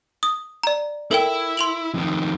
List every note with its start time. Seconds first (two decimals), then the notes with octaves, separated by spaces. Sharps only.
0.23 D#6
0.63 D5 A#5
1.11 E4 A4 A#4 G5
1.57 C6 F7 F#7
1.94 F2 D#3